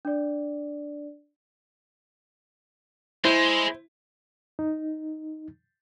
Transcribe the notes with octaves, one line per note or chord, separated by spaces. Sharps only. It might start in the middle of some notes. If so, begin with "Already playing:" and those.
D4 D5
G#3 E4 C5
D#4